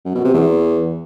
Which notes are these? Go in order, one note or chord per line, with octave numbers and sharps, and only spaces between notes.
F#2
B2
C3
E2